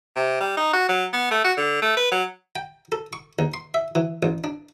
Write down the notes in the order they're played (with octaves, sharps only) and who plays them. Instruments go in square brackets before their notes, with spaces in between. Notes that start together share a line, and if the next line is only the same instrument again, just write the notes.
[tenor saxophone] C3
G3
D#4
F#4
F#3
B3
A3
F#4
D3
A3
B4
F#3
[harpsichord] G5
A4
C#6
D#2
C6
E5
E3
A1
D4